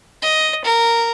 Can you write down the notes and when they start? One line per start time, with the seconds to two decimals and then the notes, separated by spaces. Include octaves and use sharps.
0.22 D#5
0.64 A#4